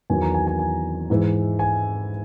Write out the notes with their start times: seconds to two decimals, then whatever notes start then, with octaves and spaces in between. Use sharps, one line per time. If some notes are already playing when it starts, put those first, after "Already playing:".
0.10 E2 D#3 F#3 G#5
0.22 A#5
0.34 G#5
0.47 G#5
0.59 G#5
1.10 G#2 E3 G#3
1.59 G#5